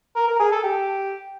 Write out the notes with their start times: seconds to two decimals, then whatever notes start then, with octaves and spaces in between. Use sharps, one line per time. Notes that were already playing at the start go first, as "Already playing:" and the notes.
0.16 A#4
0.28 A#4
0.40 G#4
0.52 A4
0.64 G4